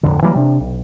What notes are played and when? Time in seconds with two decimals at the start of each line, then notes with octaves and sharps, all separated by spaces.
0.03 D1 B1 F2 D3
0.22 E3 F#3 G3 A#3
0.35 C3 D4
0.60 B1